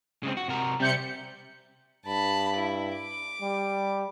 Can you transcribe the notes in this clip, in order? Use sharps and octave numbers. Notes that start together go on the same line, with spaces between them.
C#3 G#3 C4
F#4
C3 F#4 A#4
C3 G3 G6 C#7
G2 A5 B5
E4
D6
G3